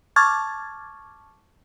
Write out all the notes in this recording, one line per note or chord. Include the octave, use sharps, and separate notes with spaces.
A5 C#6 D6 F6 G#6 A6